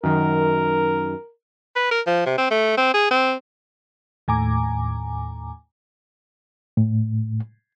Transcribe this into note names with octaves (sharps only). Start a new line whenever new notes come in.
F#2 D#3 A#4
B4
A#4
F3
C3
C4
A3
C4
G#4
C4
D#2 A2 G#5 A#5 D6
A2